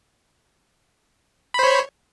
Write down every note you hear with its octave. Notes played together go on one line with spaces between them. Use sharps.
C5 C#5 B5